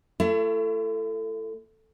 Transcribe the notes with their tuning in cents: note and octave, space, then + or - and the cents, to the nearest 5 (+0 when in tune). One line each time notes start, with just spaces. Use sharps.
A3 +15 E4 +45